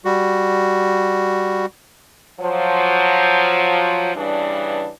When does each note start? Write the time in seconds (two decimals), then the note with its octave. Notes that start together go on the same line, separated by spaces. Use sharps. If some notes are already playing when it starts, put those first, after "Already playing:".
0.05 G3 F#4
2.40 F3 F#3 C5
4.15 G2 C#3 E3 D4